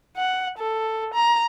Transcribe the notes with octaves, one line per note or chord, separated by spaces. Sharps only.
F#5
A4
A#5